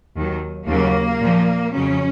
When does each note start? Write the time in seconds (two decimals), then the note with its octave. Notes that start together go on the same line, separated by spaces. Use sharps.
0.16 D#2 D#3 F#3
0.67 D#2 C#3 F#3 A#3
1.21 A#2 F3
1.73 F2 C#3 F#3 C#4